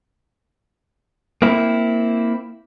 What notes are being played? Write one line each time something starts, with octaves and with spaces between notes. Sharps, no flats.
A#3 C4 E4